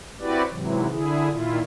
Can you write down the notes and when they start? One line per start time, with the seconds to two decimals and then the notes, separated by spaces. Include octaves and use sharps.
0.20 C4 E4 F#4 G4 B4 D5
0.50 G#2 C3 E3 F#3
0.90 D3 E4 G#4
1.30 A#2 D#3 E4 F4